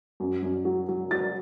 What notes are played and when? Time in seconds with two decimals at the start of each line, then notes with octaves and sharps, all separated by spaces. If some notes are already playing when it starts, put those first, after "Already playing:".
0.20 F#2
0.42 F#2
0.65 F#3
0.88 F#3
1.11 F#3 A6